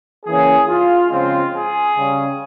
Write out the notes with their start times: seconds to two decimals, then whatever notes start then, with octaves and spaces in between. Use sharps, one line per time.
0.24 E3 A#3 C#4 G#4
0.68 F4
1.10 C#3 F3 G#3 C4 F4
1.52 G#4
1.96 C#3 G3 C#4